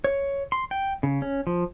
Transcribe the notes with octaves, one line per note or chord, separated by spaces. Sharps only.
C#5
C6
G5
C#3
C#4
F3